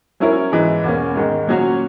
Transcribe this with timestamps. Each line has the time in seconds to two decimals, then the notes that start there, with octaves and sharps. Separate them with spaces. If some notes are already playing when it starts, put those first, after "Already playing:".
0.20 F#3 C#4 E4 A#4 C#5
0.52 G#2 E3 G#3
0.84 E2 B2 A#3 C#4
1.16 G#2 D#3 G#3
1.47 A#2 F#3 C#4 F#4 C#5